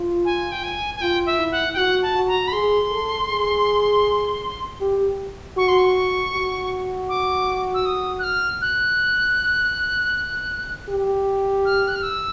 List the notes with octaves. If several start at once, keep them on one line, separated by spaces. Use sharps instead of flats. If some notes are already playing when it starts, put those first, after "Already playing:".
Already playing: F4
G#5
G5
G#5
G#5
F4 G5
E5
E4
F#5
G5
F#4 F#5
A5
F#4
A#5
B5
G#4 C6
A4
G#4
G4
F#4 C#6
C6
C#6
F#4
D6
E6
D#6
F#6
F6
F#6
G4
F6
F#6
F6
E6